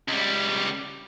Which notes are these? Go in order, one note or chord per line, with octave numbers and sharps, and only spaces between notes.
C#2 G3